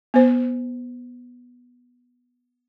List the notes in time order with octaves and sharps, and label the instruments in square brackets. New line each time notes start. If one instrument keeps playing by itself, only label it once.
[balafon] B3 C5